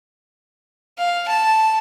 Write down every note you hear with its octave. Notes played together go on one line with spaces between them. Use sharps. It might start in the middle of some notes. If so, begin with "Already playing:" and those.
F5
A5